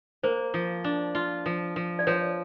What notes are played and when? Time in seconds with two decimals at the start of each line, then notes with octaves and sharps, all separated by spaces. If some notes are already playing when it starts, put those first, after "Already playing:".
0.23 A#3 C5
0.54 F3
0.84 D4
1.15 F4
1.46 F3
1.76 F3
1.99 D5
2.07 F3 B4 C#5